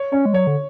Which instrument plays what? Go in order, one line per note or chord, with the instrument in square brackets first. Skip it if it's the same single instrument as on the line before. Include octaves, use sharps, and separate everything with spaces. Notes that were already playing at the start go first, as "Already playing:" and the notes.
Already playing: [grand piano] C#5
[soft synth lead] C#4 [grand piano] C#5
[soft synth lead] G#3
[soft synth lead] F#3 [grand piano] C#5
[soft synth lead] D3